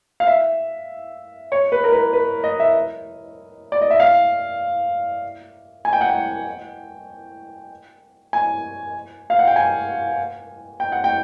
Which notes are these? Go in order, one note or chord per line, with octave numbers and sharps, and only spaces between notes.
F5
E5
C#5
B4
A#4
B4
B4
D#5
E5
D5
D#5
E5
F5
G#5
G5
F#5
G5
G#5
F5
F#5
G5
G#5
G5
F#5
G5